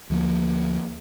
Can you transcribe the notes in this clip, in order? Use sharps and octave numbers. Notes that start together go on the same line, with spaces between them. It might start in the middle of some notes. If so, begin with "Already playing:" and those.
D2 F3 A#3